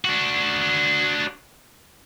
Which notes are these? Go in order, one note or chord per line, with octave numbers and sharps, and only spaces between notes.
D4 F#4